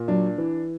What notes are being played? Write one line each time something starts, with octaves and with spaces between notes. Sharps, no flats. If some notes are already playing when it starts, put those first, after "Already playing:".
Already playing: A#2
F#3 D4
E3